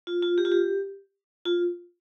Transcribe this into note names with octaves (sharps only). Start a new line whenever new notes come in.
F4
F4
G4
F4
G4
F4